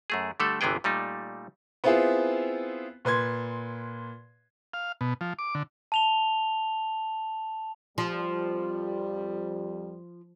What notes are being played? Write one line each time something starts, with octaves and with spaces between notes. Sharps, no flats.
F#2 A3 G#4
D3 G3 A3 A4
G1 C3 E3 B3 G#4 G5
A#2 G3 A3 D#4
B3 C4 E4 F4 G#4
A#2 B4 C6 G#6
F5
B2
F3
D6
D3
A5 F7 G7
F2 F3 G3